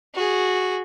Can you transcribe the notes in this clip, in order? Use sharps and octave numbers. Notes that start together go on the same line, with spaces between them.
F#4 G#4